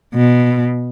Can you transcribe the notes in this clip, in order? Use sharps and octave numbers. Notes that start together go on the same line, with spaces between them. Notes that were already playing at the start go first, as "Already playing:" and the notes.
B2